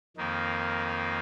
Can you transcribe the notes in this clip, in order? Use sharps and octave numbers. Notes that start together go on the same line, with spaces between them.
F2 D#3 A#3 D#4